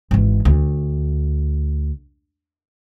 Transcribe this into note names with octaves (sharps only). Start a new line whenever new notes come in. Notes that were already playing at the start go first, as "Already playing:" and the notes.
G#1 E3
D2